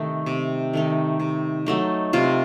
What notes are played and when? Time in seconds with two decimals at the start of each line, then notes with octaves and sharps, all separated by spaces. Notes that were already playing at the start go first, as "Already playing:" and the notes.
Already playing: C3 D#3 A3 D#4
0.26 C3
0.73 D#3 A3 D#4
1.20 C3
1.66 F#3 A3 D#4
2.13 C3 F4